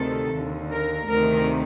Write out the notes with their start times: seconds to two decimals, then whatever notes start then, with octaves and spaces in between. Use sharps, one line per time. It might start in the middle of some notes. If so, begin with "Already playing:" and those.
Already playing: D2 C3 D#3 A4
0.34 D#2 D3
0.72 A#4
1.10 D2 C3 D#3 A#4